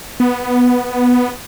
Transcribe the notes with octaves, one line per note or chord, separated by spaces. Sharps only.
B3